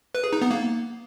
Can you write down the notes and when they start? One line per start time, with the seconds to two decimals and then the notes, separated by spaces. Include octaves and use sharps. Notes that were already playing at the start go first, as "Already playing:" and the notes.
0.15 B4
0.24 G#4
0.33 D#4
0.42 B3
0.51 A#3